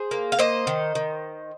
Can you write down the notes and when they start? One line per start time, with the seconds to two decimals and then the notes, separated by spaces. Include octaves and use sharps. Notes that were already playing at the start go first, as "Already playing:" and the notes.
Already playing: G#4 C5
0.11 A#3
0.32 F5
0.38 A#3 C5 D#5
0.67 D#3
0.95 D#3